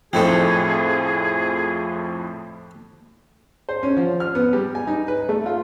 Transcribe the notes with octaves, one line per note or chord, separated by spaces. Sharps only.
F2 A2 F3 C4 D#4 G#4 A4
C5
C#4
F3
F6
B3
G3
G#5
D#4
B4
A3
F4